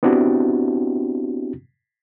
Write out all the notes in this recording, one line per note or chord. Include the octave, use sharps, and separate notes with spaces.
B3 C4 D4 E4 F#4 G4